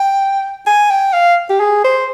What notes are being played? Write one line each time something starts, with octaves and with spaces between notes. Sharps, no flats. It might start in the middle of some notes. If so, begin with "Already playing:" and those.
Already playing: G5
G#5
G5
F5
G4
G#4
C5